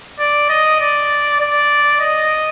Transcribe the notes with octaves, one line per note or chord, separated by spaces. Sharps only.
D5
D#5
D5
D5
D#5